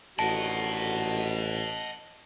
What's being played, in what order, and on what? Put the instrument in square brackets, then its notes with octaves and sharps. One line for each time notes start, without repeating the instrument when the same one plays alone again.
[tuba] A1 [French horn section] D3 D#3 F#4 [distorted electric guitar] D#5 F#5 [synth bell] A5